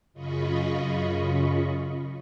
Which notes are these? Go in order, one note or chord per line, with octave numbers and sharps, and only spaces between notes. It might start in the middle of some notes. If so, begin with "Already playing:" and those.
F#2 C#3 F4 D#5 B5 C#6